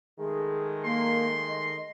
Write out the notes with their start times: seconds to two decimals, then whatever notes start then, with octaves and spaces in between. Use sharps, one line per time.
0.19 D#3 G#3 A3 G#4
0.84 A#3 C6
1.48 D#5